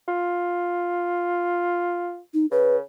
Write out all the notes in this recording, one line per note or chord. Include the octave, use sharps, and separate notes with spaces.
F4
D#4
C#3 B4